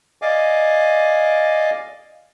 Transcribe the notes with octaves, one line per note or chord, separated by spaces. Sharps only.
D5 D#5 F5 G#5 D6